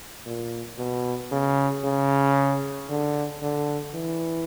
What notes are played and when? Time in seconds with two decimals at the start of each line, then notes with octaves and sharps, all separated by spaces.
0.26 A#2
0.78 B2
1.32 C#3
1.84 C#3
2.89 D3
3.43 D3
3.94 E3